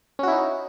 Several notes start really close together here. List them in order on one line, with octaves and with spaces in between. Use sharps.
C#4 F#4 E4 D#4